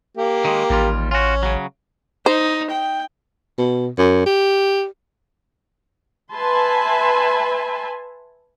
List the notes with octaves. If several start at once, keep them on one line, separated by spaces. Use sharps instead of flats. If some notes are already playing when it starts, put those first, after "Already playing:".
A#3 G4
D#3 G#3
A1 D#2 G3 F4
C#4 F4 F#4
C#3 F#3
D#4 C5
G5
B2
F#2
G4
B4 E5 G#5 A5 B5 C6